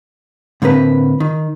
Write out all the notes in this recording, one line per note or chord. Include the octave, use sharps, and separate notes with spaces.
A2 D3 A#3 C4 B4
D#3